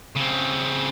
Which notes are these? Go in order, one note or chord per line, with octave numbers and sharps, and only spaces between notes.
C#3 C4